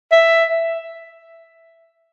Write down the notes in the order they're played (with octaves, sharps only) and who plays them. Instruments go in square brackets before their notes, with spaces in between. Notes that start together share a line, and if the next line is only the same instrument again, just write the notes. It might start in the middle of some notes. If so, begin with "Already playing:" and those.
[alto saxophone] E5